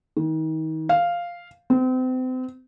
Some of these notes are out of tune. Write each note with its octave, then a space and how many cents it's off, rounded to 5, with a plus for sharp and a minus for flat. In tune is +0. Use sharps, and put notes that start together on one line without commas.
D#3 +30
F5 -5
C4 -35